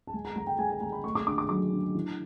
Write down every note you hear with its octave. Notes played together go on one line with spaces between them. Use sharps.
A5
G#3 G#5
A#5
G#3 A#5
G5
G#3 G#5
G#5
G#3 A#5
B5
A3 C#6
D6
D4 D6
D6
F#3 D6
D4
E3